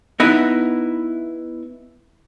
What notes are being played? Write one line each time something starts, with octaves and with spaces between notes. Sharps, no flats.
B3 D#4 E4 B4